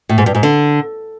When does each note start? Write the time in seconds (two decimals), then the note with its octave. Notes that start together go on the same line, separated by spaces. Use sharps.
0.09 A2
0.18 G#2
0.26 G2
0.35 G#2
0.43 D3